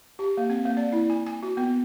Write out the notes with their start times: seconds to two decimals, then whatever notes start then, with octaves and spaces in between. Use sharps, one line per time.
0.19 G4
0.37 A#3
0.50 C4
0.65 A#3
0.77 D5
0.92 E4
1.10 G#5
1.27 G#5
1.43 F#4
1.57 B3